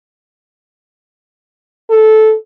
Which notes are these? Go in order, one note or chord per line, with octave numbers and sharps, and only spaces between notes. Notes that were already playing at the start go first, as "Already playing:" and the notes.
A4